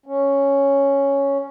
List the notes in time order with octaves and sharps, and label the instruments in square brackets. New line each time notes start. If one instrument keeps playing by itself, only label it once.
[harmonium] C#4